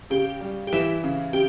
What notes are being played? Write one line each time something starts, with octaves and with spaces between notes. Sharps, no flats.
C#3 G4
G3
G4
E3 E4
C#3
C#3 G4